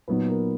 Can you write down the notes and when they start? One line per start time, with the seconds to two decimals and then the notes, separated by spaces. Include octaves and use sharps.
0.08 A#2 F#3 B3 D#4 B4
0.28 A#4